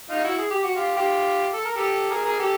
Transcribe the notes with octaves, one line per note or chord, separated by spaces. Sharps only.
D#4 F4
E4 F#4
G#4
G4
F#4
F4 G4
F4 G4
A4
A#4
G4 A4
G#4 A#4
G#4 A#4
G4 A4